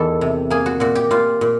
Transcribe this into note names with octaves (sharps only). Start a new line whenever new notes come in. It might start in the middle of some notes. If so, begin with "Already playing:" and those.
Already playing: E2 D#3 A4
C3
A#3 G#4
F#4
A#2 F#4
G4
A#2 F4
A#2